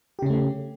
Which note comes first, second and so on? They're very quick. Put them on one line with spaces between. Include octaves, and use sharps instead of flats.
G4 C#3 C#4 A3